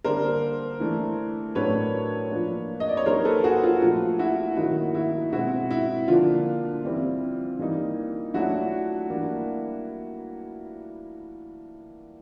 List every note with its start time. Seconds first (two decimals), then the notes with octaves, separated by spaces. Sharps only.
0.05 D3 G3 A#3 D4 A#4 C5
0.80 E3 A3 D4
1.55 A2 F#3 A3 D4 B4 C#5
2.31 F3 A#3 D4
2.80 D#5
2.89 D5
2.97 C#5
3.06 F#3 A#3 D#4 A#4 C5
3.25 A4 B4
3.44 F#4 G#4
3.63 F4
3.82 A#2 F3 A3 F4
4.19 E4 F#4
4.57 D#3 F#3 A#3 D#4 E4 F#4
4.94 E4 F#4
5.33 B2 G#3 C4 E4 F#4
5.71 E4
6.08 D3 F3 A#3 D4 F4
6.84 E3 G3 C4 E4
7.59 E3 G3 A#3 D#4
8.34 F#3 A3 D4 E4 F#4
9.10 E3 G3 A#3 D4